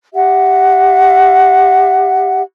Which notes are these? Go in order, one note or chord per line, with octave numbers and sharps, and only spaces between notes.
G4 E5 F#5